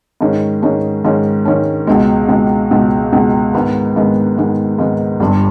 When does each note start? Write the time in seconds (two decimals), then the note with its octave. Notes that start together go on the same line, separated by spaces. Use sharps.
0.21 G#2 D#3 G#3 C#4
0.62 G#2 D#3 G#3 C#4
1.04 G#2 D#3 G#3 C#4
1.45 G#2 D#3 G#3 C#4
1.87 C#2 B2 G#3
2.29 C#2 B2 G#3
2.71 C#2 B2 G#3
3.12 C#2 B2 G#3
3.54 G#2 D#3 G#3 B3
3.96 G#2 D#3 G#3 B3
4.38 G#2 D#3 G#3 B3
4.79 G#2 D#3 G#3 B3
5.20 G1 G2 G3